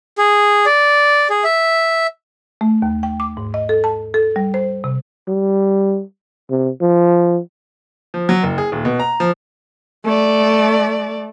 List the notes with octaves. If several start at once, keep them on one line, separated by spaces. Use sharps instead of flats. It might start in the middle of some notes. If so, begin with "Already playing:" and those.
G#4
D5
G#4
E5
A3
D#2
G5
D6
G#2
D#5
A4
A5
A4
G3
C5
C3
G3
C3
F3
F3
F#3
F#1
G#4
D#1
B2
A#5
F3
A3 D5